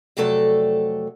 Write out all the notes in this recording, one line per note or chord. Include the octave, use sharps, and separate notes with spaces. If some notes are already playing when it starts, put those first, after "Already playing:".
F2 C3 F#3 A3 A4 D5